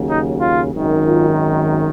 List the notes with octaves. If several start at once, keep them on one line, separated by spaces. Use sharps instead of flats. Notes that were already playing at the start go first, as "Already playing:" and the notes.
Already playing: D#2 C#3 F#3
D#4
F4
G#1 F#2 D#3
F4